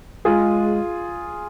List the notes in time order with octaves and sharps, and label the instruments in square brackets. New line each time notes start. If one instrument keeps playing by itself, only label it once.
[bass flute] G#3 [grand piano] F4 G#4